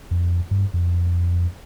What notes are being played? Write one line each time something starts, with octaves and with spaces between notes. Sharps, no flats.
F2
G2
F2